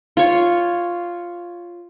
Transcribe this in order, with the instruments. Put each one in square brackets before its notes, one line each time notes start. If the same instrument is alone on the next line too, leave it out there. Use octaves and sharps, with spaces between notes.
[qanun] F4 C#5